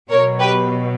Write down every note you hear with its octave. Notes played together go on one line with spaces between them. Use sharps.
B2 F#3 A#4 C#5
G4 B4